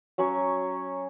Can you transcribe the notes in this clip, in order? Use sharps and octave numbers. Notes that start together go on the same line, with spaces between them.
F#3 C#4 C#5 C#6